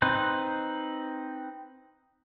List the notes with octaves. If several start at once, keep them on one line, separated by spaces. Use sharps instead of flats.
C4 D#4 B4 C5